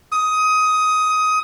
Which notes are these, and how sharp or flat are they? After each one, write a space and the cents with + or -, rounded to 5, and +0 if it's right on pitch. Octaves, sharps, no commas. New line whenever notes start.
D#6 +15